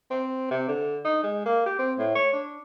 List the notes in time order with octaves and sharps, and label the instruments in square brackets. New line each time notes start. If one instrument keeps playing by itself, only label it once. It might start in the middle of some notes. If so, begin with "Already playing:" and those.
[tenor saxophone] C4
C3
D3
D#4
G#3
A#3
G4
C4
A2
C#5
D4